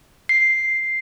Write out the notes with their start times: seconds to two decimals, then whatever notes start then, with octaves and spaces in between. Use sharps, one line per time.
0.29 C7